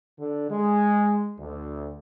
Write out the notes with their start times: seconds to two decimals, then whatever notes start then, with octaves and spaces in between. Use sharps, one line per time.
0.19 D3
0.51 G#3
1.40 D2